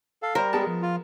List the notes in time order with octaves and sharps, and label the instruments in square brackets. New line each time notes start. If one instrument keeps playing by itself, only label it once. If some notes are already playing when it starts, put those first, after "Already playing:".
[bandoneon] A4 F5
[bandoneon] G3 [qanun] A#4 [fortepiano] C5 F5
[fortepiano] G#3 B3 A5 [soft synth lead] G4
[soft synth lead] F3
[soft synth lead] F3 [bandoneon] F4